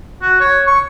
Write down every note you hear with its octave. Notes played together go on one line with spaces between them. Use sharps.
F#4
C#5
C#6